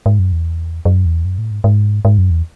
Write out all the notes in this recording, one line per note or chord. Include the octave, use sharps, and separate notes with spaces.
G#2
F#2
E2
F#2
E2
F#2
A2
G#2
G#2
G#2
F#2
E2